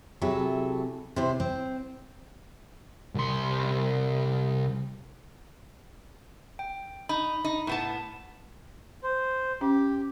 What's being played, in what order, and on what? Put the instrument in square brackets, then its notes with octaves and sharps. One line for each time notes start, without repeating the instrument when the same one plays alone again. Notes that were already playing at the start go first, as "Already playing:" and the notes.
[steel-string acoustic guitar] C3 F#3 E4 G#4 A4
C3 E4 C5
C4
[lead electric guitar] C2 C6
[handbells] G5
[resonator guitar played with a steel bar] D#4 [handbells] B5
[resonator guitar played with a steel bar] D#4
A2 B3 A5
[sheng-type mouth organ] C5
[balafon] C#4 [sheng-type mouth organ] G4